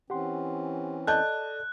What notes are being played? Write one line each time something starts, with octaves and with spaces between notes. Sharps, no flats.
E3 C4 C#4 G4 F#5 C6
A4 D5 D#5 A5 F#6 G6